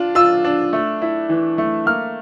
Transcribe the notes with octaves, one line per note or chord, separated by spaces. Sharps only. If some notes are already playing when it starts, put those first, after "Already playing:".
Already playing: D4 F4
F4 E6
D4
A3
E4
E3
A3
A#3 F6